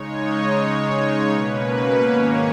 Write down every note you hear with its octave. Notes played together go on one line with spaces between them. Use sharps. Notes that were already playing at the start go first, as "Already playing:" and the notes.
Already playing: C#3 G#3 D#4 C#5
D#5
C#3 G#3 D#4 C#5
B2 A#3 C#4 B4
G#2 D#3 A#3 C#4 C#5